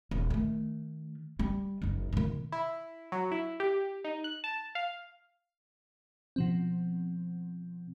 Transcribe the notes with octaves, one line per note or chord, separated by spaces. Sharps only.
D#1
D#3 A3
G3
F#1 D#4
B2 D#3
E4
F#3
E4
G4
D#4
F#6
A5
F5
B2 F3 C4